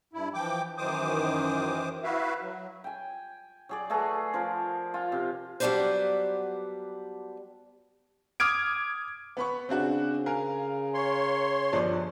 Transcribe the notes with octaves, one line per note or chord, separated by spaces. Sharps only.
G2 E4
E3 F3 G5 D6
F#2 D#3 E3 C5 D6 D#6
E4 F#4 B4 E5 F5
F#3
G5 G#5
F#3 G#4 D5
A3 F#4 G#4 B4
F3 F4 A#4
F4 G#5
C3
F#3 G3 B3 D4 B4 C5
D6 D#6 F6 G#6 D7
B3 B5 C#6
C#3 C4 D4 F#4
A#4 F5 G#5
C#5 C6
G1 F3 D5